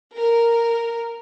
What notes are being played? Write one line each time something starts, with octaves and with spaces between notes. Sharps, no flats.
A#4